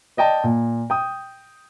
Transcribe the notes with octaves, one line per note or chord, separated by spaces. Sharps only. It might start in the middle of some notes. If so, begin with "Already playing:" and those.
D5 D#5 G5 A5
A#2
G5 D#6